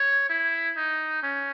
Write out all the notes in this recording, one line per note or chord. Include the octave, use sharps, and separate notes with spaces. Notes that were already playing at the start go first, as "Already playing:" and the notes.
Already playing: C#5
E4
D#4
C#4